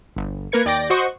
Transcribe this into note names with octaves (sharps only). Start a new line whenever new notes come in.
G1
A#3 A#4 B4 G#6 C#7
D#2 D5 G5 D6 A#6
F#4 C5 D#5 F#5 C#6